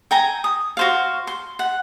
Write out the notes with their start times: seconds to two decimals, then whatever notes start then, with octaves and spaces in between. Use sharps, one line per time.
0.11 G5 G#5 A#5
0.44 D#6
0.77 F#4 C5 F5
1.27 C6
1.59 F#5